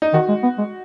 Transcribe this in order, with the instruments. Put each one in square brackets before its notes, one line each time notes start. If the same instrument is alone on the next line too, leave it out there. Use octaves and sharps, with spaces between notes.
[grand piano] D#4
[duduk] D#3 [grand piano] F#4
[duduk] G#3
B3
G#3